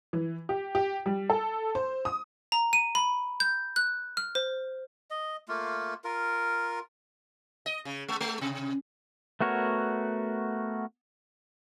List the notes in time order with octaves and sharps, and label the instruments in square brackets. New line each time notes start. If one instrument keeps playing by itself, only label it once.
[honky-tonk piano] E3
G4
G4
G3
A4
C5
D#6
[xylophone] A#5
D#7
B5
G6
F#6
F6
C5
[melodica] D#5
A3 A#3 F4
F4 A#4
[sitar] D#5
C#3
G#3
G#3
C3
[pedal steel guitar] A3 B3 F#4 A#4 C#5